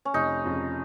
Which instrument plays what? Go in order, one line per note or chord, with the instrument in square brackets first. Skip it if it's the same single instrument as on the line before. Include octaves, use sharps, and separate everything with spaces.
[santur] C#4
[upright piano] F1 [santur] D#4
[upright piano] F2 C#3